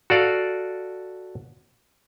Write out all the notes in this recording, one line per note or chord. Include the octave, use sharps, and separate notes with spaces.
F#4 A4 D5 F5